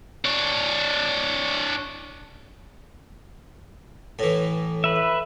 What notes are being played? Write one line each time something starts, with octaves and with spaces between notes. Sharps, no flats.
D4 C#5
A2 E3
B4 E5